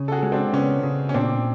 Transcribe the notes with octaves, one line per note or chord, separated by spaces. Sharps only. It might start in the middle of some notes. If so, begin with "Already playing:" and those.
Already playing: C#3
A4
F#4 G#4
G#3
C4 D4
C#3 B3 C#4
C#3
C#4
A#2 C4 D4